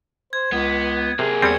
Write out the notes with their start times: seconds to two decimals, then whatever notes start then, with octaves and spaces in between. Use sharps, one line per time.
0.33 C5 G#6
0.52 C#2 B3
1.19 C3 A#3 G#4
1.42 E2 G3 C4 G#6 C#7